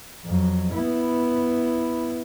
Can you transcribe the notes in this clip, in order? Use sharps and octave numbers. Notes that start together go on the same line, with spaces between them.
F2 F#3
B3 E4